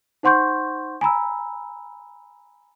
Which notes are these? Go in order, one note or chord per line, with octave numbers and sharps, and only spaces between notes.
D#4 C5 F#5 C6 C#6 G6
G#5 A#5 B5 E6